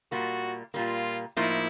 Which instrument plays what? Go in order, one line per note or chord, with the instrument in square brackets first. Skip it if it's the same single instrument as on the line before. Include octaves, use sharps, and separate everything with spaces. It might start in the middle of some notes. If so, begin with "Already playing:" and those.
[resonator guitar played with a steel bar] A#2 G3 A#3 [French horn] F#4
[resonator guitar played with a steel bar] A#2 G3 A#3 [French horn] F4
[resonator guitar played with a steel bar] A2 F3 A#3 D#4 [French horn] E4